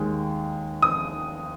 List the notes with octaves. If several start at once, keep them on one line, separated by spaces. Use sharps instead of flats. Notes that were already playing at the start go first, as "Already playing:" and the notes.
Already playing: D#2 D#3 G#3
D#6